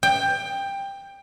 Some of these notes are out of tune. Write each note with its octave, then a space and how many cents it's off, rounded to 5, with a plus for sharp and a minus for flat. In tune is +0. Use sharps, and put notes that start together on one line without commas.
G5 +15